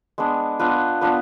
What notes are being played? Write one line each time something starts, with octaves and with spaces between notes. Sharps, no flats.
G#3 B3 D4
B3 D4 F4 B4
B3 D4 F4 B4